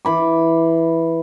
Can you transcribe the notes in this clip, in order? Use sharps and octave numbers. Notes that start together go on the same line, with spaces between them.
E3 B5 D6